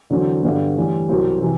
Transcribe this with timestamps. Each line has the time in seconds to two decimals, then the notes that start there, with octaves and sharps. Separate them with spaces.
0.10 E2 D3 F#3 C4
0.43 G2 D3 G3 B3
0.76 A2 E3 G3
1.09 C2 B2 F#3 C4 G4
1.41 C3 E3